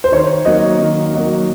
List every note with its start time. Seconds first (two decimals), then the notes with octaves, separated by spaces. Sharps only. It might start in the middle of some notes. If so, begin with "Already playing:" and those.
0.04 C5
0.12 D#3 C#5
0.45 F#3 A#3 D#4 F#4 D#5
0.79 D#3
1.12 F#3 A#3 D#4 F#4